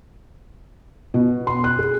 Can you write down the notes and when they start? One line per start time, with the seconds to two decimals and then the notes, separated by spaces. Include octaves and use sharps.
1.14 B2
1.47 C6
1.64 F#6
1.79 G#4